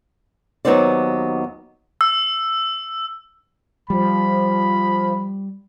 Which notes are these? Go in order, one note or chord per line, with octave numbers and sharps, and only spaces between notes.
D#2 F#3 B3 D#4 C5 D5
E6
F3 G3 B5